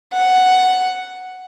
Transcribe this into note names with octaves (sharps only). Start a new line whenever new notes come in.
F#5